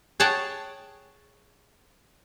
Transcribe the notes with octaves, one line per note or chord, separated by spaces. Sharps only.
G#4 C#5 F#5 G5 A5